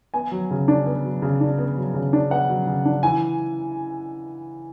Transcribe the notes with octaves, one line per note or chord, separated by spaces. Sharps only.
B3 G#5
F#3
C#3
D4
B3
F#3
C#3
D4
B3
F#3
C#3
D4
B3 F#5
F#3
C#3
D4
E3 G#5